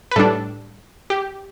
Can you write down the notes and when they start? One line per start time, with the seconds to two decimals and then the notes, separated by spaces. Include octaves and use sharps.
0.11 B4
0.16 A2 G3 D4 A4
1.10 G4